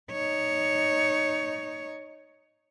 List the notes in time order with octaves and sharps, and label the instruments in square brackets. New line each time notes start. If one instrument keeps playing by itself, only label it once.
[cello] D#4 C#5